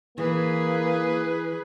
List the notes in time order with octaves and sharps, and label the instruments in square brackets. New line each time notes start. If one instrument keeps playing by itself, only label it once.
[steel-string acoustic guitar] E3 [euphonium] A#3 [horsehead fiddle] G#4 B4